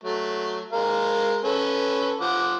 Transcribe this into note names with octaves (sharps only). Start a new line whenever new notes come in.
F#3 A3
G#3 A#4 F5
C#4 A4 B4
F3 F#5 D6